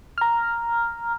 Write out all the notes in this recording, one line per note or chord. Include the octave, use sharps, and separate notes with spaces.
A#5 F6